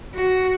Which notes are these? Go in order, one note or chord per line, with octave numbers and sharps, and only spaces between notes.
F#4